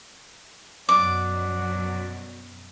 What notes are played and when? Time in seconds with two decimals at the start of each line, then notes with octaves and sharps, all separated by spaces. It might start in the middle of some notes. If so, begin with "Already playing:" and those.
0.89 F#2 B2 F#3 F#4 D5 D6